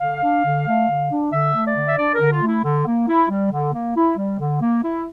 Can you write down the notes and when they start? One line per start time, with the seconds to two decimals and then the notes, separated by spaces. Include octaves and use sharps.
0.01 D3 F5
0.23 D4
0.44 D3
0.66 A3
0.88 D3
1.10 D4
1.32 D3 E5
1.54 A3
1.66 D5
1.76 D3
1.88 E5
1.98 D4 D5
2.14 A#4
2.20 D3
2.31 F4
2.42 A3
2.47 E4
2.64 D3
2.86 A#3
3.08 E4
3.29 G3
3.51 D3
3.73 A#3
3.95 E4
4.17 G3
4.39 D3
4.61 A#3
4.84 E4